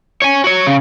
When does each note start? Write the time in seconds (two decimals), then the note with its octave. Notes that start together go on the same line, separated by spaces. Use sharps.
0.22 C#5 G#5
0.44 F#4 C#5
0.67 C#3